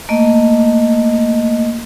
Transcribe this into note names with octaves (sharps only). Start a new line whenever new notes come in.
A3 A#3 D#5